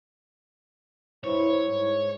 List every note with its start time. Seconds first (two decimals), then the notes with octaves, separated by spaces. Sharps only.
1.24 G2 E4 C5 C#5
1.67 G#2